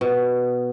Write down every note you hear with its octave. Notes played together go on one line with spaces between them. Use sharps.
B2